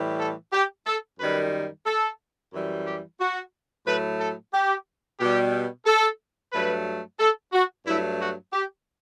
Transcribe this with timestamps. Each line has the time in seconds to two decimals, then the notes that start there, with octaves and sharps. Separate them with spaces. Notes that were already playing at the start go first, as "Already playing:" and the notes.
Already playing: A2 E3 G3
0.19 A4
0.52 G4
0.86 A4
1.19 F#2 D#3 G3 B4
1.86 A4
2.53 F#2 E3 G3
2.86 G4
3.20 F#4
3.86 A2 F#3 A3 B4
4.19 A4
4.53 G4
5.19 B2 G3 G4
5.86 A4
6.53 G2 F#3 A3 B4
7.19 A4
7.53 F#4
7.86 G2 F#3 A3 E4
8.20 F#4
8.53 G4